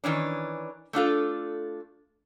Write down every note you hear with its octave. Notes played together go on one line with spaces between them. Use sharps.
D#3 E3 C#4 D4
A3 D4 F4 A4